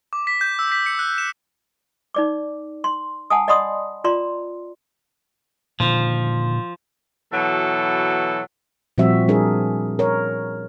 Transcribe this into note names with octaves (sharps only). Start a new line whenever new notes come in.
D6
B6
G6
E6
B6
C#7
F#6
E7
D#4 D5 D6
C6
F#5 G#5 A5 D#6
D5 D#5 F#5 B5 C6 D#6
F4 D5 A#5 C6
A#2 D3 D#3 F3
B2 E3 F#3 A4
A#2 F3 G3 C4 F#4 E5
G3 D4 G#4 A#4
A#4 C#5